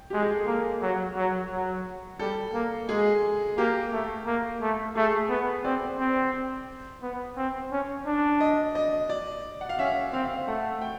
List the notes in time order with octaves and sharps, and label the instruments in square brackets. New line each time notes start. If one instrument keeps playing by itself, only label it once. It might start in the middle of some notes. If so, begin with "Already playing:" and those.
Already playing: [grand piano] G5
[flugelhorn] G#3 [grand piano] G4
[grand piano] G#4
A4
[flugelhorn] A#3 [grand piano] A#4
[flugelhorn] F#3
F#3
F#3
[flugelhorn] G3 [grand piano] A4
[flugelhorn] A#3
[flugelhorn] G#3 [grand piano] G#4
[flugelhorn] A#3 [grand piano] G4
[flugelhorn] A3
A#3
A3
[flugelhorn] A3 [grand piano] G#4
[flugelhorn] B3
[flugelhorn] C4 [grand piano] D5
[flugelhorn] C4
B3
C4
C#4
D4
[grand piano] D#5
D#5
D5
F#5
F5
[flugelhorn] C#4 [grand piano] E5
[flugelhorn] C4 [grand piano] F5
[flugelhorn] A3 [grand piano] F#5
[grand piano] G5